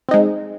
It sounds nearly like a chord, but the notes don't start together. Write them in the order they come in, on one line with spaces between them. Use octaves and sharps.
C4 D#4 G#3